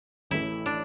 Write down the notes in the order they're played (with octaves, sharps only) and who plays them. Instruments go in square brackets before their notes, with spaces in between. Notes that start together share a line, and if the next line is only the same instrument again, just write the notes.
[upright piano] A1 A2 E3 A3 [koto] E4
[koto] D4